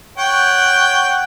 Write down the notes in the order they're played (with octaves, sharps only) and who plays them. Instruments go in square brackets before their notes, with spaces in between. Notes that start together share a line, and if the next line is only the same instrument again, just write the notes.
[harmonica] C#5 F#5 G5